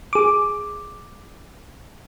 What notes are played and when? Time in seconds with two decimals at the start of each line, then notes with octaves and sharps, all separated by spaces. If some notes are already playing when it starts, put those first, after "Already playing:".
0.13 G#4 D6